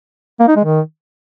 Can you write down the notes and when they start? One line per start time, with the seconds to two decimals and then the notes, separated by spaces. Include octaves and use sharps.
0.40 A#3
0.48 D#4
0.56 G#3
0.64 D#3